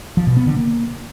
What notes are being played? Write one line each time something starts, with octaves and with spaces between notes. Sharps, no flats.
F3
B2
B3
D3
A#3